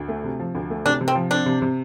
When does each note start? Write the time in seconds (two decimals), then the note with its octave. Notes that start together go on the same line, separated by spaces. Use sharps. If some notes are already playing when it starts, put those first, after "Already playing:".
Already playing: D2
0.08 A3
0.24 C3
0.39 F3
0.55 D2
0.70 A3
0.85 C3 D4
1.01 C3
1.08 C4
1.15 F3
1.31 C4 D4
1.46 C3
1.62 C3